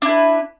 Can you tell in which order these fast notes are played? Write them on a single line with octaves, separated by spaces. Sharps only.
D4 E4 B4